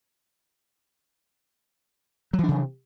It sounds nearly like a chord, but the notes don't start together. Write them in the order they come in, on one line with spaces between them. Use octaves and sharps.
F#3 E3 D4 C3